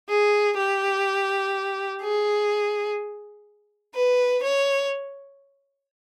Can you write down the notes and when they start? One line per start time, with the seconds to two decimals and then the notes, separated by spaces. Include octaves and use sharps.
0.09 G#4
0.57 G4
2.02 G#4
3.95 B4
4.43 C#5